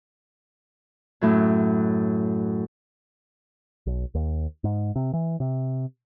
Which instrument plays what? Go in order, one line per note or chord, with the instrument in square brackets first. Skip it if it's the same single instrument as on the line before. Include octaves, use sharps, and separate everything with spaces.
[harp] F#2 A2 F#3
[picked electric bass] B1
D#2
G#2
C3
E3
C3